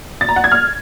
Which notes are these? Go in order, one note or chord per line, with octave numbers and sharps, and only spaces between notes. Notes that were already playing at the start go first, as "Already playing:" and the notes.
A6
A#5
F#5
G#6
F6